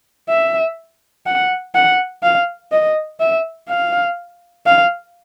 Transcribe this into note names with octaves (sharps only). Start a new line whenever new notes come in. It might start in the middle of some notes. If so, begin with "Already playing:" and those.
E5
F#5
F#5
F5
D#5
E5
F5
F5